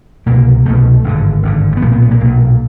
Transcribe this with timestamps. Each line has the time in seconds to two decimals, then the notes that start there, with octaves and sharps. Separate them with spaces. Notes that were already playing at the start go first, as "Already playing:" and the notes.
0.26 C2 B2 A#3
0.65 C2 B2 A3
1.04 G#1 G2 D3
1.43 G#1 G2 D3
1.77 B3
1.82 B1 A#2 A#3
1.92 B3
2.02 B3
2.11 A#3
2.21 B1 A#2